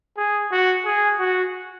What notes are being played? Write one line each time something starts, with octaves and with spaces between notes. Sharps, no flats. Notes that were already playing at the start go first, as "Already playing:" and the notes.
G#4
F#4
G#4
F#4